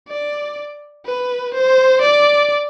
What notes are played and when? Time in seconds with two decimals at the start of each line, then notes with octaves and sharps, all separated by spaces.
0.08 D5
1.05 B4
1.54 C5
2.01 D5